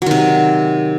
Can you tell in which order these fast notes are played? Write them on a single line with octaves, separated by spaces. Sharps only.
F#3 D#3 C3